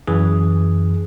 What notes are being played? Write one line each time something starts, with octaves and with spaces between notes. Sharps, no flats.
F#2 E3 G#4